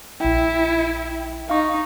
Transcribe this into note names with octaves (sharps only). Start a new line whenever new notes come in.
A#1 E4 G5
D#4 F5 C#6